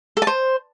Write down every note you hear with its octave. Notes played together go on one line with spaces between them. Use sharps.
A4
A5
C5